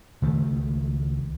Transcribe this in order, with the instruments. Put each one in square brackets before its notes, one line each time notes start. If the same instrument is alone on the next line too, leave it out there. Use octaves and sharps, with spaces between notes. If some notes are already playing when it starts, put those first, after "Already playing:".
[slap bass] C#2 D#3 A3